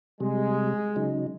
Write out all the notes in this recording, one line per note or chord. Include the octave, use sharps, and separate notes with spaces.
C3 G3 G#3
C#3 F#3 D#4